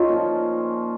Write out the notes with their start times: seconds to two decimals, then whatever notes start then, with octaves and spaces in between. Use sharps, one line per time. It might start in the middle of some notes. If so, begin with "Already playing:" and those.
Already playing: C#4 D#4 F4
0.09 A#2 F3